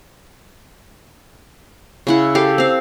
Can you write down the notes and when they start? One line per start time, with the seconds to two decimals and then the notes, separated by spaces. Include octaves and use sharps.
2.07 C#3 E4 F#5
2.35 G4 A4 F5
2.58 C4 F5